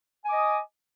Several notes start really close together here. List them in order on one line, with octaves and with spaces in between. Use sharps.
G#5 D6 D#5 D#6